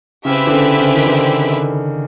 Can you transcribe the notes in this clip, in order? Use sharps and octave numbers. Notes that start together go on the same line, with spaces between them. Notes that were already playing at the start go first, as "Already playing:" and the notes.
C#3 C4 E4 G4 B4 E5
D3
C#3
C#3
D#3
D3